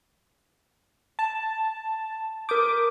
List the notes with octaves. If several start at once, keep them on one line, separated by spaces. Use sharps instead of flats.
A5
A#4 D6 D#6 G6